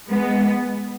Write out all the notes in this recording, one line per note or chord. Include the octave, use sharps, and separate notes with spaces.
G#3 B3